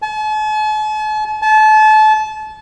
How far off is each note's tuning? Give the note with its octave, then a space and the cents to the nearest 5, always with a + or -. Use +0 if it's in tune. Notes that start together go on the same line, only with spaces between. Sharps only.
A5 -45
A5 -30